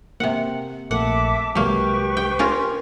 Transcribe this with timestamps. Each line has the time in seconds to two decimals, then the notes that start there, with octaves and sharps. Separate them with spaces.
0.20 C3 A#3 F#5
0.91 A#1 A3 A#3 E5 F#5 A5 D6
1.55 C2 F#3 G#3 A#3 G4 B4 C#6
2.17 G5
2.39 C#4 F4 A#4